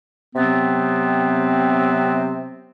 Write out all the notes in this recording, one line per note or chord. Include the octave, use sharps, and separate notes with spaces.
C3 F#3 B3 C4